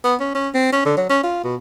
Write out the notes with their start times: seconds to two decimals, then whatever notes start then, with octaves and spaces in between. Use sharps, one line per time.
0.04 B3
0.20 C#4
0.35 C#4
0.54 C4
0.72 C#4
0.86 D3
0.97 F#3
1.10 C#4
1.24 F4
1.44 B2